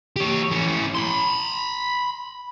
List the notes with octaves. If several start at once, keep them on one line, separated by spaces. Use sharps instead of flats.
G4 C#5
E3 C#4
B5 C6